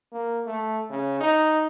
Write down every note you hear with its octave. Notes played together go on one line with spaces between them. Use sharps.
A#3
A3
C#3
D#4